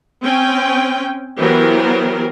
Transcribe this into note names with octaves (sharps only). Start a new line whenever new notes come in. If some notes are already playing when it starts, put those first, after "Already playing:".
C4 C#4 G5 G#5
E3 F#3 B3 G4 A#4 C5